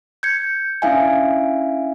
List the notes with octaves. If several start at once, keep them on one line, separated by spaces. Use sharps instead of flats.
G6 G#6 C#7
C#4 D4 E4 E5 F5 G#5